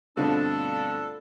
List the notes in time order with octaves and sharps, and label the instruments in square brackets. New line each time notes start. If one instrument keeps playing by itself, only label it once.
[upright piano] G2 B2 D3 [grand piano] A3 C4 F4 [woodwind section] D4 [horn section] A4